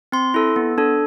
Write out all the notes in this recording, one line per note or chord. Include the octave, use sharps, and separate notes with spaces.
C4 C6
E4 A4
B3
D4 A4